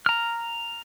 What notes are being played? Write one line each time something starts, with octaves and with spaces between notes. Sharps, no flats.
A#5 F6